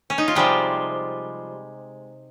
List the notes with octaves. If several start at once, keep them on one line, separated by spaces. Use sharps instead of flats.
C#4
D#4
F4
C3 F3 G3 G#3 G4